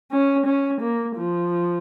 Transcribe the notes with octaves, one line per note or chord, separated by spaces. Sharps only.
C#4
C#4
A#3
F3